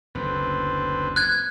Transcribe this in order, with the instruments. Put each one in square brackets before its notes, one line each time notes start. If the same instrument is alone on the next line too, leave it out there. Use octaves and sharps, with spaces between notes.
[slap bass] F#1 D2 [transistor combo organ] D3 C4 B4
[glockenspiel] F#6 G#6